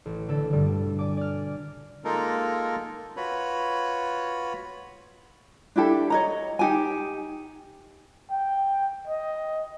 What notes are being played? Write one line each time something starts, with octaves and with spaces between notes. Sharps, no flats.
A1
D3 A4
G2 B2 D3 G3
D5 G#5 D6
D5 F6
G#3 A#3 D#4 F4 A4 A#4
F4 F#4 B4 C#5 B5
D4 E4 G4 A4
C#5 D#5 A#5
D#4 G4 G#5
G5
D#5